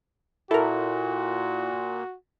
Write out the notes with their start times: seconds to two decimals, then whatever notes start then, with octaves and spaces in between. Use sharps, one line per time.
0.51 A#2 E4 F#4 A4 A#4